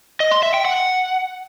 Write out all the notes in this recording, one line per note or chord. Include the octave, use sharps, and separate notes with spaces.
D#5
C6
E5
G5
F#5